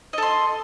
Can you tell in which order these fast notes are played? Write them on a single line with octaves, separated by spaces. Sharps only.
D#5 A4 C6